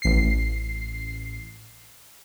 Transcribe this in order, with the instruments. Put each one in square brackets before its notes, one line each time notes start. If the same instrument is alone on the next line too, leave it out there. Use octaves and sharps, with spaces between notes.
[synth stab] A1 C7